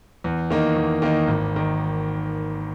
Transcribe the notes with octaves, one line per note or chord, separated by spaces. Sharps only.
E2
D#3 A#3 D#4
E2
D#3 A#3 D#4
G#1
D#3